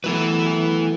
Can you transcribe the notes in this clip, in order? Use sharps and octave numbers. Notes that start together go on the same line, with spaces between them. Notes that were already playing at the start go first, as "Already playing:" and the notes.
E3 F#3 A3 B3 E4 B4